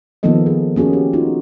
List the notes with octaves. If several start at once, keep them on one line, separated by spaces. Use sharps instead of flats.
D#3 F3 A#3 B3 A4 D#5
G#4
A#3 C#4 F#4 G#4
G4
D#4 F4 F#4